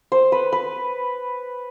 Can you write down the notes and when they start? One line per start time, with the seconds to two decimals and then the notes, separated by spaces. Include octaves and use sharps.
0.12 C5
0.32 B4
0.52 B4